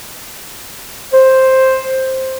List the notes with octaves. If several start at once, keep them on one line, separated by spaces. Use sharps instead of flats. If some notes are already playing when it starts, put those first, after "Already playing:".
C5